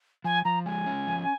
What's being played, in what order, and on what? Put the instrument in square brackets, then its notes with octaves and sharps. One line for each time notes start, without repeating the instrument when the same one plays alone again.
[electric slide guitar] F3 [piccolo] G#5
[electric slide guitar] F3 [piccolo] A#5
[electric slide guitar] G#3 [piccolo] G#5
[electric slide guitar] C#4
F3